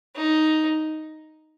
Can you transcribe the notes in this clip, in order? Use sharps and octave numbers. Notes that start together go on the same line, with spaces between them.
D#4